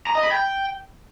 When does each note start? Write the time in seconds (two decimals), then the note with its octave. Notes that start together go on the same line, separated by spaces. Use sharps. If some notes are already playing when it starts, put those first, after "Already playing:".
0.07 A#5
0.15 D#5
0.23 B5
0.32 G5